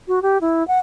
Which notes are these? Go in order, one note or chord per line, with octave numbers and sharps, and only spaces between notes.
F#4
G4
E4
F#5